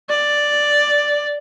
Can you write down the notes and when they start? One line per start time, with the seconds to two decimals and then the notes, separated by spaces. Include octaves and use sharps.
0.10 D5